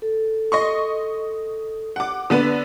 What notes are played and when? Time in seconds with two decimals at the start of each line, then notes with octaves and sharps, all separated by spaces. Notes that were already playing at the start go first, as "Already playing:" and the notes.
0.02 A4
0.52 D#5 C6 C#6
1.96 F#5 D6
2.30 D3 B3 B4